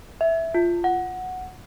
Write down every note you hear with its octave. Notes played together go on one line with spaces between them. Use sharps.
E5
F4
F#5